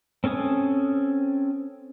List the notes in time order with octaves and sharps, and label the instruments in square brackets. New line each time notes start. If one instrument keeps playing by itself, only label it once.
[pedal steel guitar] C4 C#4 A4 G#5 D#6